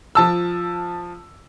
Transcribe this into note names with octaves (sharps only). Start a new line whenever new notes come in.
F3 A5 E6